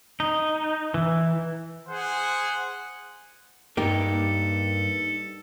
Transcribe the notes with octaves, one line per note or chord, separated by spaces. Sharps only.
D#4
E3
G#4 C5 F#5
G2 A#3 D#4 G4 A4